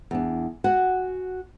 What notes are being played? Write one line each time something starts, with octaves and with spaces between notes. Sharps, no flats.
E2 D4
F#4 F#5 G#5